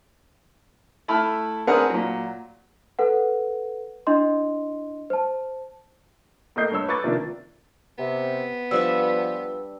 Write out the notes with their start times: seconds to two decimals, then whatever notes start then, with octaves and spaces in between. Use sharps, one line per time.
1.08 A3 E4 B5 F6
1.67 C4 D4 G#4 A#4 B4 F#5
1.90 A#2 F#3
2.99 A4 B4 F#5
4.07 D4 E4 D#5 C6
5.10 C5 A5
6.56 A2 A#3 D#5 G6 C7
6.71 G2 C#5 E6
6.88 B4 C#6 D6 G#6 A6
7.04 C3 D#3 F3 A#3 D4 F4
7.98 C3 B3
8.71 F3 G3 D4 B4 E5 E6